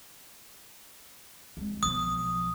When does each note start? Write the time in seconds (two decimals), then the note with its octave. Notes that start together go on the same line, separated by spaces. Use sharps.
1.57 G#3 C4
1.83 B1 F3 D#6